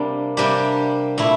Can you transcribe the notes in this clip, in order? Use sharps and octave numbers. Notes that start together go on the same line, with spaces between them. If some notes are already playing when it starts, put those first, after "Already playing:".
Already playing: C3 G3 A#3 D4 G4
C3 G3 A#3 D4 G4
A#2 A3 E4